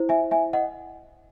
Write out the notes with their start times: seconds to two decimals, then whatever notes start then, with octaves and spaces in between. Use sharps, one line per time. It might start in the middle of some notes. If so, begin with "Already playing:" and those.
Already playing: E4 C5
0.09 E5 G#5
0.31 E5 G#5
0.53 D#5 F#5